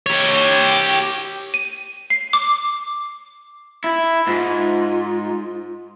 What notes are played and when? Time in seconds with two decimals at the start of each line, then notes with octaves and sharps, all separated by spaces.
0.06 G4 C#5
1.54 D#7
2.10 C7
2.33 D6
3.84 E4
4.27 G#2 F4